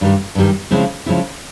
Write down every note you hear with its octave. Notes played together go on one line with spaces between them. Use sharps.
G2 D#3 G3
G2 D#3 G3
C#3 F3 G#3 C4 E4
C#3 F3 G#3 C4 E4